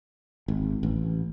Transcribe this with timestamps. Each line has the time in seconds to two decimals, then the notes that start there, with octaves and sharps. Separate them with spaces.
0.48 G#1
0.83 A1